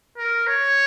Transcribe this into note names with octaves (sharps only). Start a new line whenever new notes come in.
A#4
C#5